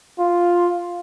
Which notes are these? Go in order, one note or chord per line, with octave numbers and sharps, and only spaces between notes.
F4